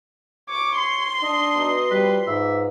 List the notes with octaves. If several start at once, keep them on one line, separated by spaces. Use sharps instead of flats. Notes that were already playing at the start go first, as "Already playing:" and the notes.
C#5 D6
C6
D4 D#5
B2 D#4
F3 G3 B4
G#2 B4 D5 E5 F5